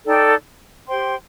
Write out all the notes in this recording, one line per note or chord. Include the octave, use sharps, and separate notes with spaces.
D#4 A4 D5 G5
G4 C5 G5 C6